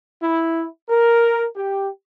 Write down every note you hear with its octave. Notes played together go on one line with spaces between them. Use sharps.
E4
A#4
G4